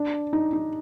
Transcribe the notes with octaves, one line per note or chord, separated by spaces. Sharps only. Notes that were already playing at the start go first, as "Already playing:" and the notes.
Already playing: D4
D#4
D#4